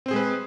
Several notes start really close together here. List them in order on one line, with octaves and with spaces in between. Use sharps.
C4 C5 G#4 G#3 B4